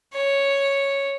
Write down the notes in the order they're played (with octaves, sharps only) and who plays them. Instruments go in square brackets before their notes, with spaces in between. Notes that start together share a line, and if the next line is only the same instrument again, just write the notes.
[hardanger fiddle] C#5